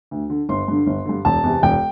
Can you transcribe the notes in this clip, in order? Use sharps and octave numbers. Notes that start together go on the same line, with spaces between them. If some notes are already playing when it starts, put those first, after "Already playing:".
D2
D3
G1 C6
G2 D3
G1
G2 D3
E1 A5
E2 C3
E1 G5